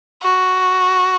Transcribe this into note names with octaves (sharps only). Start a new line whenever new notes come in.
F#4